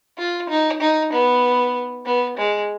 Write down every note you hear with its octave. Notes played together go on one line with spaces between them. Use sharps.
F4
D#4
D#4
B3
B3
G#3